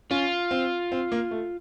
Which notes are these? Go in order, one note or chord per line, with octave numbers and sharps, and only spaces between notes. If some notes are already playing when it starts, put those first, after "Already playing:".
C#4 F4
C4
C4
A#3
A3